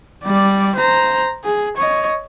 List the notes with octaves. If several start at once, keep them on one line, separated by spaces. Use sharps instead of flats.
G3 D5
C5 A#5
G#4
C#5 D#5